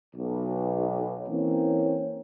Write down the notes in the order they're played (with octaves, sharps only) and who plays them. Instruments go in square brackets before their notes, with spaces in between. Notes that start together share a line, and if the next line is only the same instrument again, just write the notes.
[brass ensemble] B1
E3 A#3 C4 C#4